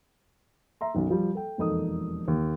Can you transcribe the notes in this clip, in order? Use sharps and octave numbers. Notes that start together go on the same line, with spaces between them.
E5 A#5 C6
B1 F#2 D#3
F3 G3
A4 G5
E1 F2 A#3 D#4 A4 D#6
D#2